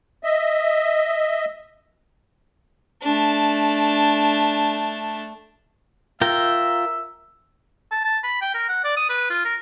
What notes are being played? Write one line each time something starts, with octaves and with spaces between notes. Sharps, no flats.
D#5 E5
A3 D4
F4 A#4 E5 G5
A5
A5
B5
G5
A#4
F#5
D5
D#6
B4
F4
A#4